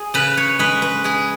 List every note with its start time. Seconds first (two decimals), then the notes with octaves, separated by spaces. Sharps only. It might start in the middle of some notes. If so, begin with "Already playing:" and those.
Already playing: G#4
0.14 C#3 B4
0.37 C#5
0.59 G#3 B4
0.82 B4
1.04 G#3 G#4